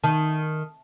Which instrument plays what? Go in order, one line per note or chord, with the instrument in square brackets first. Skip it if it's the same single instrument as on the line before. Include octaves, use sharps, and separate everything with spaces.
[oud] D#3 [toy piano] A5